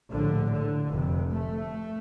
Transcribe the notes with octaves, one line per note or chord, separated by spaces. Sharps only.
A#1 A2 D3
D3
F1 F2 C3
A3